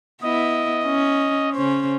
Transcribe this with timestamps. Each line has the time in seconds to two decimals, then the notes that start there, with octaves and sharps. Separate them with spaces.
0.23 B3 E4 D#5
0.85 C#4
1.53 C#3 C#4 C5